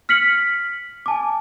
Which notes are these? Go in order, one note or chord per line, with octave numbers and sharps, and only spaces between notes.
F6 B6 C#7 F#7
G#5 A5 D6